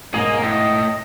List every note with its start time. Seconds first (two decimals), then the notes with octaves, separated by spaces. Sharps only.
0.14 E1 G#2 A#3 G#4 D#5
0.42 A2 D#5